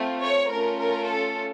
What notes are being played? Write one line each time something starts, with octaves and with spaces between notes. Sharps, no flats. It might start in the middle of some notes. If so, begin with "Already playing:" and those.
Already playing: A3 C4 F4
C#5
A3 C#4 F4 A#4
A#4
A4